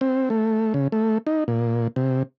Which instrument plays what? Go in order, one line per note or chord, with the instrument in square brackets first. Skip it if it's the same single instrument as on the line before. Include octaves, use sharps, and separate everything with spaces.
[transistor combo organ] C4
A3
C#3
A3
D#4
A#2
C3